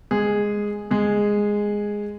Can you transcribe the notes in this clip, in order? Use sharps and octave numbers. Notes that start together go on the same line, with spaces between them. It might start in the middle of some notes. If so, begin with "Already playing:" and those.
G#3 G#4
G#3 G#4